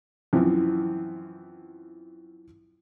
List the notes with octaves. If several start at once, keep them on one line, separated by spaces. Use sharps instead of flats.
F#2 E3 F3 C4